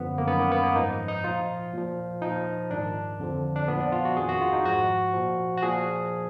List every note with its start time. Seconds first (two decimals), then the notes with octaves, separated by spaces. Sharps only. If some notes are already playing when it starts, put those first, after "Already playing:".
Already playing: F#2 D3 F3 B3
0.18 A#3
0.27 F#2 D#3 B3
0.39 A#3
0.52 B3
0.63 A#3
0.76 G#2 F3 D#4
1.08 D#4
1.24 A#2 F3 F4
1.73 A#2 F3
2.22 A#2 F3 D#4
2.70 G#2 D#3 D4
3.19 F2 D3 F3
3.56 D4
3.68 A#2 F3 B3
3.80 D4
3.92 F4
4.05 F#4
4.16 F2 D#3 G#4
4.29 F#4
4.41 F4
4.53 D#4
4.65 G#2 F3 F#4
5.14 A#2 F3
5.57 F#4
5.62 A#2 F3 G#4